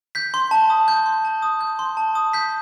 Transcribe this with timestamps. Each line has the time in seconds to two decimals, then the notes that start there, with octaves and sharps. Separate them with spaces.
0.15 G6 B6
0.34 C6
0.51 A5
0.70 D#6
0.88 G6
1.06 C6
1.25 A5
1.42 D#6
1.61 G6
1.79 C6
1.97 A5
2.15 D#6
2.33 G6 B6